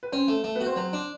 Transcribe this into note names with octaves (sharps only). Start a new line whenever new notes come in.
B4
C4 C#4 C5
A3
A3
B3 B4
F#4
C4 C5
F#3 C4 C5
D4